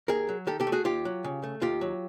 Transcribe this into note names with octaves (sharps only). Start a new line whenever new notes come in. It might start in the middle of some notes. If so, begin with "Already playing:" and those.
D#2 G#4 A#4
F#3
D#3 G4 A4
G4 A4
A3
F#4 G#4
D#2 F4 G4
F#3
C#3
A3
D#2 F4 G4
F#3